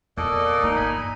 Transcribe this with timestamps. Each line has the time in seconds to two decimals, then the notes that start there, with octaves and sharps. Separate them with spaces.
0.17 E2 A#2 A4 D5 D#5
0.63 E3 A#3 D#4
0.76 G1 G#5 B5